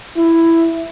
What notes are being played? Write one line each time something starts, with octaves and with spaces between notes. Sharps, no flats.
E4